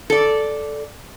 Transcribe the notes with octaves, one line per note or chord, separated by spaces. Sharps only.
A4 D5